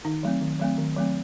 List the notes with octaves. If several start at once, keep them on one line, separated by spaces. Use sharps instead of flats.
D#3 D#4
F#3 A3 C4
D#3
F#3 A3 C4
D#3
F#3 A3 C4